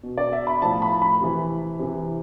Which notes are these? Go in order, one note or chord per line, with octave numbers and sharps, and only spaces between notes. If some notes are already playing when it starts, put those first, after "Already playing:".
B2
D5
E5
B5
A2 F3 A5
B5
B5
C3 E3
C3 E3